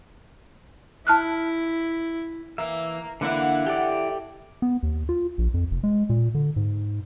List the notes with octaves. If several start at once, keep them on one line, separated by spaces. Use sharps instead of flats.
E4 A5 F6 F#6
E3 A#3 E5
D3 E3 A#3 D4 E4 F#5
G4 A4 D5
B3
D#2
F4
A#1
F2
F1
G#3
A#2
D3
G#2